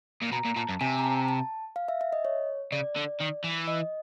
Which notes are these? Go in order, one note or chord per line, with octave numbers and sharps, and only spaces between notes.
A#2
B2 A#5
A#2
A#2 A5
F#2
C3 G#5
A#5
A5
A5
F5
E5
E5
D#5
C#5
C#3 D5
D3
D#3
E3
D#5